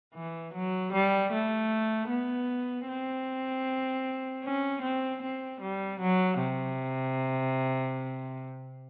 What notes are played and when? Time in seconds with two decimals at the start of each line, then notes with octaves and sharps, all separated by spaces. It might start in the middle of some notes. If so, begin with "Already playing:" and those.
0.15 E3
0.54 F#3
0.93 G3
1.32 A3
2.10 B3
2.88 C4
4.44 C#4
4.82 C4
5.22 C4
5.61 G3
6.00 F#3
6.38 C3